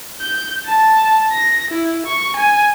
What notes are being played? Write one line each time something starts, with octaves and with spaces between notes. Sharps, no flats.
G6
A5
A#6
E4
C#6
G#5